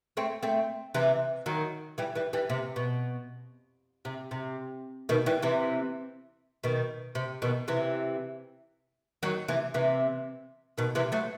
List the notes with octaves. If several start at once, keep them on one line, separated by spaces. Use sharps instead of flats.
A3 C4
A3 C4
C3 E3
D#3 F#3
E3 G3
E3 G3
E3 G3
C3
B2
C3
C3
B2 D#3
E3 G3
C3 E3
B2 D#3
C3
B2 D#3
C3 E3
D#3 F#3
C3 E3
C3 E3
B2 D#3
C3 E3
F#3 A3